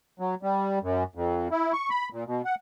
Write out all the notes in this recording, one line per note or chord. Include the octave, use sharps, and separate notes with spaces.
F#3
G3
F#2
F2
E4
C#6
B5
A#2
B2
F#5